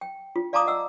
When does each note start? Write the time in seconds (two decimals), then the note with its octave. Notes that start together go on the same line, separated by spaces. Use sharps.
0.01 G5
0.36 F4
0.53 D5 F5 A5 A#5 D6 D#6
0.67 D#5 F#5 E6